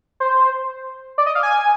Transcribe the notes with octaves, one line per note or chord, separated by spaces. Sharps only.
C5
D5
D#5
F5
G#5